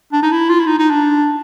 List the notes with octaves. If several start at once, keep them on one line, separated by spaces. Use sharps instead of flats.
D4
D#4
E4
F4
E4
D#4
D#4
D4